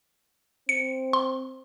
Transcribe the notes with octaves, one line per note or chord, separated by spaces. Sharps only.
C4 C#7
C6